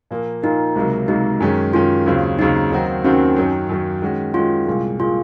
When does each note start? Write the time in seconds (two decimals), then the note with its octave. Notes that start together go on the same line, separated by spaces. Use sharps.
0.11 A#2 F3 A#3
0.42 A#2 F3 A#3 D#4
0.75 C#2 C3 F#3 A#3
1.08 C#2 C3 F#3 A#3 D#4
1.40 F#2 D#3 G#3 C#4
1.73 F#2 D#3 G#3 C#4 F4
2.06 D#2 C#3 F#3 C4
2.39 D#2 C#3 F#3 C4 D#4
2.71 D#2 D#3 F#3 C4 F#4
3.04 D#2 D#3 F#3 C4 C#4 F#4
3.36 F#2 D#3 F#3
3.69 F#2 D#3 F#3
4.02 D#3 G#3 C#4 F#4
4.34 D#3 G#3 C#4 F4 F#4
4.66 C2 A#2 G#3
5.00 A#2 G#3 F4